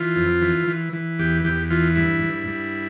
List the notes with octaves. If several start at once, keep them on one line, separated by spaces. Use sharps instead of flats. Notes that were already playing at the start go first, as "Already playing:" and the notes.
Already playing: E3 F4
F2
E3
E3
E3
E2 G4
E2 G4
E3 F4
G2 E4
G2
G2